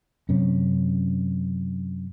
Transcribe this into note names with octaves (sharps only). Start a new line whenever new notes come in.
F#2 C3 C#4